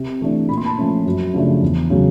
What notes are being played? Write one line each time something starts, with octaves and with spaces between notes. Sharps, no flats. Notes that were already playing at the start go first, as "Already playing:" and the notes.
Already playing: C3
E3 A3 D4
A#2 B5
C6
A5 B5
F3 A3 C#4
F#2
C#3 F3 A3 D4
E2
C#3 F#3